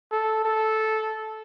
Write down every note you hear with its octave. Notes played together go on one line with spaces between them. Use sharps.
A4
A4